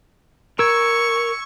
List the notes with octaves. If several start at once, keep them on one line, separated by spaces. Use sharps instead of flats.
A#4 C#6 E6 G#6